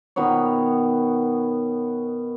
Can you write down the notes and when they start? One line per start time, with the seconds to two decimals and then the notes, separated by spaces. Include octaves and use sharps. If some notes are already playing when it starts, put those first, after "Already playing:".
0.16 B2 D#3 B3 C#5